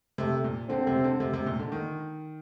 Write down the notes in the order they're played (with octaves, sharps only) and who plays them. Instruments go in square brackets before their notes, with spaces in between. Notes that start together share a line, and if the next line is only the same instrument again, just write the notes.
[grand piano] C3 [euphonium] A3
[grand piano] A#2
[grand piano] D3 [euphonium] C4
[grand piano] C3
D3
C3
C3
A#2
D3
D#3